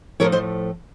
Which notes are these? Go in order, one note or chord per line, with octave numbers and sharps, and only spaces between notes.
A2 F3 A3 A#4 C#5
C5 D#5